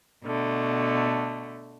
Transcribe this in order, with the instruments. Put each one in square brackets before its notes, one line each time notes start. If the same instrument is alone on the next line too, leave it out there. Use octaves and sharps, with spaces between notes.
[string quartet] B2 D3 A3